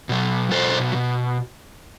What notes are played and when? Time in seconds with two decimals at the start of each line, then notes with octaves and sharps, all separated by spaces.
0.09 B2 F#3
0.52 B2 F#3 A4 C5
0.95 B2